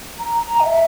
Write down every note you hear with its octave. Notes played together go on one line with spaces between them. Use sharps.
A#5
A#5
D#5
E5